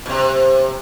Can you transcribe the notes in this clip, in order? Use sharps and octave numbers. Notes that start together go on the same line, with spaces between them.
B2
C3